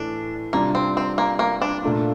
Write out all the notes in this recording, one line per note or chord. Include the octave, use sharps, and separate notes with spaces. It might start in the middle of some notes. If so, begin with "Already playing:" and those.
Already playing: A2 E3 A3 D4
C3 G3 A#3 D4 F4
C4
C4
A#3
A#3
D4
A#2 A3 D4 F4